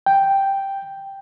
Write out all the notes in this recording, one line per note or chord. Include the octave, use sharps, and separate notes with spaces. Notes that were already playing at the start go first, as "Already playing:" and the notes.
G5